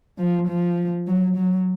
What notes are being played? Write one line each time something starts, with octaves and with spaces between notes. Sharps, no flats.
F3
F3
F#3
F#3